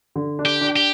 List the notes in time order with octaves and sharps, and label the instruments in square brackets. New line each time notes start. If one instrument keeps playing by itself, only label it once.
[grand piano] D3
D4
[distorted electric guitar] G4
[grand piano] D4
[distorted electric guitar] G4